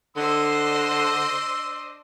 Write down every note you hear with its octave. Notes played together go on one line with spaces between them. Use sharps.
D3 D4 C5 D#5 C6 E6